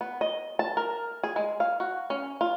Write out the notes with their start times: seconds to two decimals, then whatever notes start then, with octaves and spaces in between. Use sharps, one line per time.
0.01 B3
0.21 D#5
0.59 A5
0.77 A#4
1.24 G#4
1.36 G#3
1.60 F5
1.80 F#4
2.10 C#4
2.41 F4